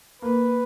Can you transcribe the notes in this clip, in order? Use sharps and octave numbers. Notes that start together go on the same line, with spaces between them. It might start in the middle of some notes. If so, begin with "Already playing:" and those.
A#3 B4